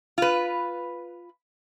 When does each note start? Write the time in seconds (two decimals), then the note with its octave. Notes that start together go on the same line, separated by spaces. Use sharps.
0.18 F4 B4